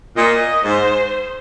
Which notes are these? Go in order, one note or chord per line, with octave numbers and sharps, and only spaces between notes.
A#2 D#5
G#2 C5